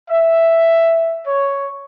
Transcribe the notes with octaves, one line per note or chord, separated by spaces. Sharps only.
E5
C#5